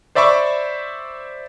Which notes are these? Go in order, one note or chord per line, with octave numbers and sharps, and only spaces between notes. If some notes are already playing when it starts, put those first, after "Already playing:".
C5 D5 E5 B5 C#6 D6